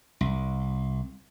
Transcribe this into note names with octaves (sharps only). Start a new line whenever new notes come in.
C2